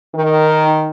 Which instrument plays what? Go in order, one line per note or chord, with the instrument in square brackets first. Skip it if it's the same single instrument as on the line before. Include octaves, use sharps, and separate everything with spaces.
[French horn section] D#3